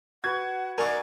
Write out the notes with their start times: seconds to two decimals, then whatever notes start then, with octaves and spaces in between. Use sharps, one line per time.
0.24 F#4 B4 F#5 G#6
0.78 A#3 D#4 A#4 D5 E5 F#5 G#5 C#6